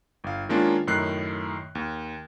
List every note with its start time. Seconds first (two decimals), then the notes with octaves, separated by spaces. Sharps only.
0.24 G1 F5
0.49 D#3 G#3 A#3 C#4 D4 F4
0.87 F#2 A2 D#3 F#6 C7
1.75 D#2